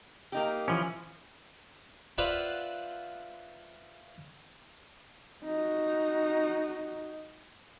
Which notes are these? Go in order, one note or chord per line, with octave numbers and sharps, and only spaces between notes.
A#3 D#4 G4
E3 F3 C#4
F4 B4 C5 D5 E5 F#5
D#4 F#4